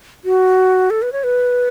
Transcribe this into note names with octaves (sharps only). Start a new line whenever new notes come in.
F#4
A4
B4
C#5
B4